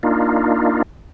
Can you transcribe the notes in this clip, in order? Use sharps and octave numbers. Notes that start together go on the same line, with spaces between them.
A#3 D4 D#4 F4